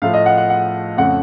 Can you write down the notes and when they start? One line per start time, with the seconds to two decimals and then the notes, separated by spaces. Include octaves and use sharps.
0.02 A2 F3 A3 F5
0.14 D#5
0.26 F#5
0.38 F#5
0.50 F#5
0.97 F2 C#3 A3 F#5